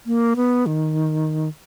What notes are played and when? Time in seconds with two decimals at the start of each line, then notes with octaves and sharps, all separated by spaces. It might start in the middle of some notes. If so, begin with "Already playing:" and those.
0.06 A#3
0.36 B3
0.66 D#3